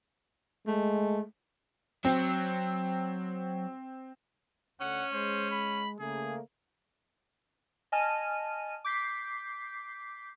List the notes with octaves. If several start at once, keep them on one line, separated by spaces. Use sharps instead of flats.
G#3 A3
F#3 C4
D2 C#4 F#5
G#3 C5
B5
C#3 A3 A#3 G#4
D#5 G#5 A5 F6 D#7
D6 G6 B6 C7